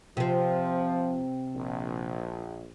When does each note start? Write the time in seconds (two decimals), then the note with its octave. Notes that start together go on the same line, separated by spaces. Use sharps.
0.17 C3 F3 C4
1.55 A#1